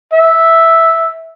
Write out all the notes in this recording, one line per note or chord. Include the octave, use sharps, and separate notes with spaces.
E5